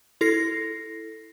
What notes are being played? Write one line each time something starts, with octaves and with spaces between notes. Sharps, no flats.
E4 A4 A#6 C7